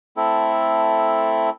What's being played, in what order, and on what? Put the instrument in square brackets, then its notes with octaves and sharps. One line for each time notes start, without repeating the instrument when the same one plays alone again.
[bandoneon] A3 C4 E4 A4